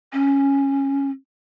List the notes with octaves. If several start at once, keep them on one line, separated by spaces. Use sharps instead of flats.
C#4